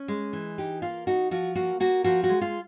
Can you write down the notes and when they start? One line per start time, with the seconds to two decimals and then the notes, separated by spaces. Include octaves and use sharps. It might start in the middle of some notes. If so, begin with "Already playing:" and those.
Already playing: C#4
0.08 G#3
0.33 E3
0.58 D#4 G4
0.82 A#3 F4
1.07 D#4 F#4
1.31 F3 F#4
1.55 A#3 F#4
1.80 A#3 F#4
2.04 F3 F#4
2.24 F#4
2.29 G#3
2.41 F4